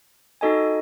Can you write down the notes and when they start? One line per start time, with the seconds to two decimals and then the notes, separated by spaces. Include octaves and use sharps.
0.41 D#4 F#4 A4 D#5 G#5